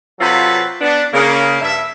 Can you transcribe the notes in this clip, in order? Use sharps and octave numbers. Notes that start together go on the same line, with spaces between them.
C3 F#3 C4 F4 A4 B4
B3 D4
C#3 A#3
G2 E5